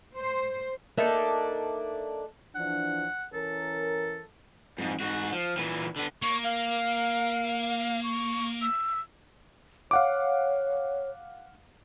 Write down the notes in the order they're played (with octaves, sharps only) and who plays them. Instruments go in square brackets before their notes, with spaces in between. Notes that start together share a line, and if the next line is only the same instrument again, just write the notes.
[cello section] C5
[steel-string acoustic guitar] A#3 E5 [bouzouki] D4 D#4 A4
[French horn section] E3 F3 D4 [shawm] F#5
[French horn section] E3 C#4 A#4 [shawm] A4
[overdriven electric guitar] F2 G#2
G#2 F#4
F3
A#2 E3
D3 B3
[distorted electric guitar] A#3 [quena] C#6
[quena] F5
C#6
E6
[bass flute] C#5 [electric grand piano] F5 F#5 D6